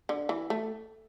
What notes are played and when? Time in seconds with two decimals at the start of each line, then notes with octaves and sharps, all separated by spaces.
0.09 D3
0.29 E3
0.50 A3